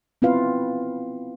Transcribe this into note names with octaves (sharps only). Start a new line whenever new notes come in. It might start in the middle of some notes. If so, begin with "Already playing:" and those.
B3 C4 E4 F4 B4 F5